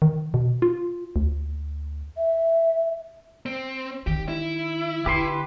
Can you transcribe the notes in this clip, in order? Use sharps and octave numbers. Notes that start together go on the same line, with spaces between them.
D#3
B2
F4
D2
E5
C4
D#3 G4
E4
D3 G4 B4 C6